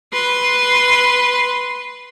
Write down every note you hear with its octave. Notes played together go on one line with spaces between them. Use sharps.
B4 C6